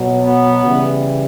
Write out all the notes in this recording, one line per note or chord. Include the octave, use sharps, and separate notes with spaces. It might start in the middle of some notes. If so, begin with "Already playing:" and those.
Already playing: B2 F#3
B3
C#3 E3 G3